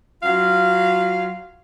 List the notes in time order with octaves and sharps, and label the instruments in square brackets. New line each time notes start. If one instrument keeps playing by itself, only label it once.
[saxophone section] F#3 F4 F5